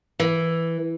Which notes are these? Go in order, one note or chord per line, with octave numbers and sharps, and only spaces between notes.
E3